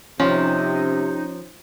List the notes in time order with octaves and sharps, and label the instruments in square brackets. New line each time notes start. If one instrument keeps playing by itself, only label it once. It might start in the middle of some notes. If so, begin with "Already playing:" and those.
[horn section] C3 [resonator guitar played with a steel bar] F3 [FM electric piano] C#4 [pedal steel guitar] D#4